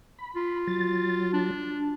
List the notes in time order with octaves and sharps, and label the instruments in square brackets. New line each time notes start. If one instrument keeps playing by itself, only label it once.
[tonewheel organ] B5
[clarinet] F4
[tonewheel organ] F#3 A6
[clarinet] D4